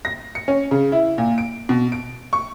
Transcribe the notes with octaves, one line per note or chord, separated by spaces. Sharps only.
A#6
C#7
C#4
C#3
E4
A#2
D7
B2
D7
C#6